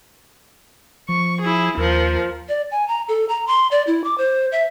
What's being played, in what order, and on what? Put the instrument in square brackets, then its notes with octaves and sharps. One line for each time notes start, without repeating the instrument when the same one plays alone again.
[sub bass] F3 [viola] C#6
[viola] E4 G#4
[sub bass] D#2 [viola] F3 A#4
[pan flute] D5
G#5
A#5
A4
A#5
C6
D5
E4
D6
C5
E5